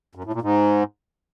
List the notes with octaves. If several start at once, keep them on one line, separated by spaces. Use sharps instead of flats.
F#2
A2
A#2
G#2